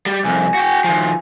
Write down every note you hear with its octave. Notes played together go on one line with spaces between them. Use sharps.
G3
C2 F2 G#5
F#4 G5
D#3 F3